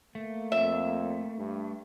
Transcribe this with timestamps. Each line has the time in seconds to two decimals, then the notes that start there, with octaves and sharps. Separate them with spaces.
0.15 A3 A#3
0.52 F2 E5
1.38 G2